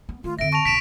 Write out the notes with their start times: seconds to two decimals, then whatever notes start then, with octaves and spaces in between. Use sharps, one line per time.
0.09 B3
0.24 D#3 A3 F4
0.39 F2 D3 E5 A#6 D7
0.53 A5 C#6 A#6 F7
0.65 B1 B2 B6 D7 E7